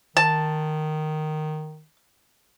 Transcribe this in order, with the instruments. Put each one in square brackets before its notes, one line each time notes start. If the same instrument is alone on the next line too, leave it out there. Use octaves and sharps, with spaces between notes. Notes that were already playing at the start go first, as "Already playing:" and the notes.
[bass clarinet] D#3 [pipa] A5